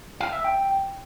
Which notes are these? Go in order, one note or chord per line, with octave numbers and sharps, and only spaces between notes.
F5
E5
G5